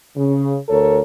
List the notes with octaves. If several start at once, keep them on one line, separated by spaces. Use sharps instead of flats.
C#3
D2 A4 A#4 C#5